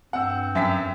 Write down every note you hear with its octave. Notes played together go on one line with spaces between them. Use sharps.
G2 C4 F#5 E6
F#2 E5 G5 B6